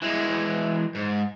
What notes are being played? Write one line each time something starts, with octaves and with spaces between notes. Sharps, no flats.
E3 G#3
G#2